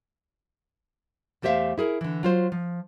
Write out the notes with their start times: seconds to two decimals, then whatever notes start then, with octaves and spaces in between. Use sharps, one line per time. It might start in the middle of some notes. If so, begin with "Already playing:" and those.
1.42 E2 A3 G4 C5 E5 F5
1.78 E4 G#4 A#4
2.01 D3 E3
2.23 F#3 F4 C5
2.52 F3